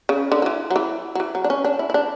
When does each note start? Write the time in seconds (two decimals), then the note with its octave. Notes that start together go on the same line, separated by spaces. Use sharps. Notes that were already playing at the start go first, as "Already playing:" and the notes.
0.09 C#3
0.32 D3
0.42 F#3
0.46 E3
0.70 F#3
0.76 E3
1.15 F#3
1.20 E3
1.35 F#3
1.44 D4
1.50 C#4
1.65 D4
1.79 E4
1.90 E4
1.94 D4